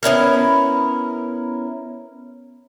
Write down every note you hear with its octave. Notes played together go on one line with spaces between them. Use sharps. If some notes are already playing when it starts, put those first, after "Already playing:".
B3 C#4 E4 A#4